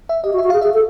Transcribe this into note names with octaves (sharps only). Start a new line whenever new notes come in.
E5
G4 D#5
F#4
E5
F#4
G#4 F5
G#4 E5
A4